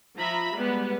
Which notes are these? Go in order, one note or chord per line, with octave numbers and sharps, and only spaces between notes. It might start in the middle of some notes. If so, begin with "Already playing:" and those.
F3 E5 A#5 B5
G3 G#3 B3